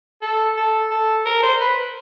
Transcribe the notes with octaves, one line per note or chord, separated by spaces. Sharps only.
A4
A4
A4
A#4
C5
B4